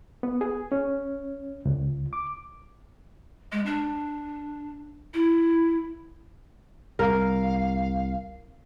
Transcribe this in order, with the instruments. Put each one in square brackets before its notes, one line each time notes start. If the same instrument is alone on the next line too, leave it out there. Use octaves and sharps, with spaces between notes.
[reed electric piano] B3
G#4
C#4
C#2
D6
[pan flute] G#3
D4
E4
[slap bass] C2 [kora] A#4 [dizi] F5